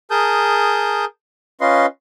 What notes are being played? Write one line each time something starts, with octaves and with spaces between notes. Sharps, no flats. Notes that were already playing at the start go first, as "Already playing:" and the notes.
G#4 A#4 A5 D#6 G6
C#4 F4 B4 D#5 C6